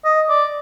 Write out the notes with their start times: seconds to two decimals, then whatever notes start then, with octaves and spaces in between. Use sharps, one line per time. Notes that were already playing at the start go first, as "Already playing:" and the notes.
0.05 D#5
0.29 D5